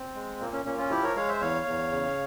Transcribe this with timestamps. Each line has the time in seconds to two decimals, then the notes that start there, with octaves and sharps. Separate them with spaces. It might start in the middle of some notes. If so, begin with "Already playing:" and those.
Already playing: C4
0.15 G#3
0.40 A#2 A#3
0.53 A#3 C#4
0.65 A#2 A#3 C#4
0.78 C#4 F4
0.90 F3 E4 G4
1.03 A#4 C#5
1.16 G#3 C#5 F5
1.29 C5 E5
1.41 E2 C#5 F5
1.66 E2
1.91 C#3